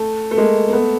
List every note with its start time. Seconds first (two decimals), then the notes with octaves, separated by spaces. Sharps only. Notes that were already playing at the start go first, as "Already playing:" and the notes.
Already playing: A3
0.31 A3
0.37 G#3 A#3
0.69 A#3
0.73 A3 B3